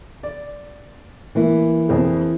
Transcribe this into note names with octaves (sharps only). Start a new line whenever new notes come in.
D5
E3 A#3 E4
F2 C4 G#4